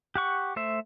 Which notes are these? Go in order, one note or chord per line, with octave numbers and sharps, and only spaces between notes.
G4 F#5 C#6
A3 C5 E5